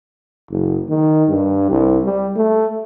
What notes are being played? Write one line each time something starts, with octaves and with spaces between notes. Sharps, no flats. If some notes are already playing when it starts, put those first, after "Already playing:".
F#1
D#3
G2
C2
G3
A3